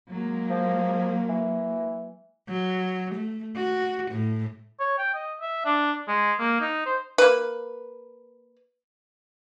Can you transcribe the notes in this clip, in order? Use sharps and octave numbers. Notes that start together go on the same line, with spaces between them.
F#3 G#3 A#3
F3
E3
F#3
A3
F#4
A2
C#5
G5
D#5
E5
D4
G#3
A#3
D#4
C5
A#3 B4